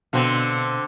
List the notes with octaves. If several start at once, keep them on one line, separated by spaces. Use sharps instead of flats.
B2 D3 C4 F5